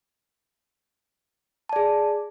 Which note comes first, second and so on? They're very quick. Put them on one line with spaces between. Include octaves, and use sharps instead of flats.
A5 D5 G#4